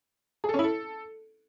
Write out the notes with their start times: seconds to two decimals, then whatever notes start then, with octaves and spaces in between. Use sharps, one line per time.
0.44 G#4
0.49 A4
0.54 C#4
0.59 E4
0.64 A4